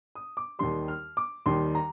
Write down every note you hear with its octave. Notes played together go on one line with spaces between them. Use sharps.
D#6
D6
D#2 D#3 G3 C6
F6
D6
D#2 D#3 G3 C6
A#5